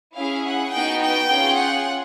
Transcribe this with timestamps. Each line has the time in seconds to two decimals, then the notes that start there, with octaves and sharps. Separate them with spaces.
0.16 C#4 E4 G#4 F5
0.45 F#5
0.73 B3 D#4 F#4 G5
1.02 G5
1.31 C#4 F4 G#4
1.59 F#5